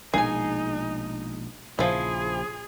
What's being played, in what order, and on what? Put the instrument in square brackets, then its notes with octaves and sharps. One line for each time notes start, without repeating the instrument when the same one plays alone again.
[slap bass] A#1 B2 G#3 [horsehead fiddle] D#4 [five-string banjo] G#4 G#5
[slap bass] A#1 C#3 [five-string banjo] F3 E4 [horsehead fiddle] G#4